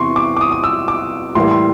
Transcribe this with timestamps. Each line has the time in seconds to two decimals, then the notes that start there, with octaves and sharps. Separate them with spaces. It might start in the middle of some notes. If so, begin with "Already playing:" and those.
Already playing: E2 C3 E3 C6 C#6
0.16 D6
0.37 D6
0.41 D#6
0.52 D#6
0.64 E6
0.88 D6
1.35 A2 E3 G3 A#3 C6
1.51 C6